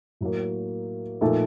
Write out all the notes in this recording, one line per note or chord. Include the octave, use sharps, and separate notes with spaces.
A2 F#3 A#3
A#2 F3 A3 D#4 A4